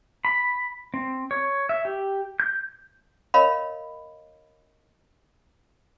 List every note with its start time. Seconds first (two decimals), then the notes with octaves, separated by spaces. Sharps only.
0.25 B5
0.94 C4
1.31 C#5
1.69 E5
1.85 G4
2.40 G6
3.34 A#4 C#5 D#5 F5 B5